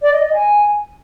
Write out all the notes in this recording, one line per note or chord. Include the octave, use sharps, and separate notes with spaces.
D5
D#5
D#5
G#5